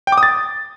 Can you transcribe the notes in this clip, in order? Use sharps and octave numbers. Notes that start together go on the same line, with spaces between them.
G5
D6
D#6
A6